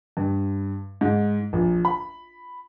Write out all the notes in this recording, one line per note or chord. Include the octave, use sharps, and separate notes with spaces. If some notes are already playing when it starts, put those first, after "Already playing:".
G2
G#2
A#1
B5